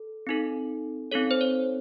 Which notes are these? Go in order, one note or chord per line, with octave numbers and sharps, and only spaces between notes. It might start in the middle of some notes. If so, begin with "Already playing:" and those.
Already playing: A4
C4 D#4 A4
C4 D#4 A4 C#5
C5
C#5